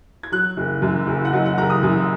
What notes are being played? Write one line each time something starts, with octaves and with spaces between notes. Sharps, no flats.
G#6
F#3 F#6
F#1
F#2
F#1
F#5
F#3 D#5
F#5
F#1 A#5
D#6
F#2